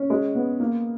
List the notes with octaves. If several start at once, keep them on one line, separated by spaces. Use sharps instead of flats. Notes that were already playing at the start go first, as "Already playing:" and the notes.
Already playing: C#4
G#3
B3
A#3